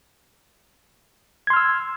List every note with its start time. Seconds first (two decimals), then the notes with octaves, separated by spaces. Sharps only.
1.47 G#6
1.50 C6
1.53 F6
1.56 E6